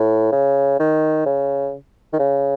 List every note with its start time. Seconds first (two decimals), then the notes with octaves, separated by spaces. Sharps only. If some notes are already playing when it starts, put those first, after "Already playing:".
Already playing: A2
0.32 C#3
0.80 D#3
1.26 C#3
2.13 D#3
2.19 C#3